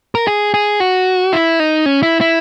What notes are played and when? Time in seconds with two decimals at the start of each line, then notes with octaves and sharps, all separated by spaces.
0.15 A#4
0.27 G#4
0.54 G#4
0.80 F#4
1.33 E4
1.60 D#4
1.86 C#4
2.03 E4
2.21 E4